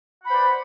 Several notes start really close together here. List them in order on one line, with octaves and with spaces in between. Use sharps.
F#5 B5 C5 B4 D5